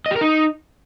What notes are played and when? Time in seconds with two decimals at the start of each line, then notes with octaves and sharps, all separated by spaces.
0.06 D#5
0.11 G4
0.16 A#4
0.21 D#4